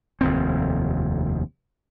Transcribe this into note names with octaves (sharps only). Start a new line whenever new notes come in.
F1 D#2 C4